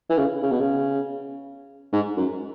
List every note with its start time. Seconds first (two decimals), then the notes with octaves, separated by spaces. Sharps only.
0.10 E3
0.18 C#3
0.43 C#3
0.51 B2
0.60 C#3
1.93 G#2
2.17 F#2